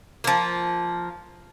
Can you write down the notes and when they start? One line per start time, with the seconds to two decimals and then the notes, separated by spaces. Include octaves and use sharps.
0.24 F3 A#3